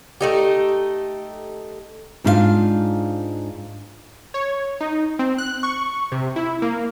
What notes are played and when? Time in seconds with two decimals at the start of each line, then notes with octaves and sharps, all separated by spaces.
0.21 A3 D#4 G4
2.24 G#2 D4 F4 G4 F5
4.34 C#5
4.81 D#4
5.19 C4
5.38 F#6
5.63 C#6
6.12 C3
6.36 E4
6.62 A#3